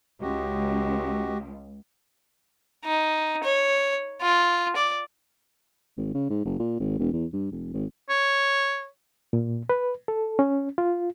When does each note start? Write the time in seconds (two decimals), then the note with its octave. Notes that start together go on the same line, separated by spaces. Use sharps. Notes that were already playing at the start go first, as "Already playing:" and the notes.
0.22 C#2 F#4 G4 D#5
2.85 D#4
3.44 C#5
4.22 F4
4.76 D5
5.97 G#1
6.14 C#3
6.30 G#2
6.45 F#1
6.60 A#2
6.79 G#1
6.99 E1
7.13 E2
7.33 G2
7.52 F1
7.74 G#1
8.10 C#5
9.33 A#2
9.70 B4
10.08 A4
10.39 C#4
10.78 F4